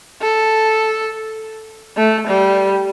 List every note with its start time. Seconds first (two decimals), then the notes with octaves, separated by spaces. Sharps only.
0.22 A4
1.97 A3
2.27 G3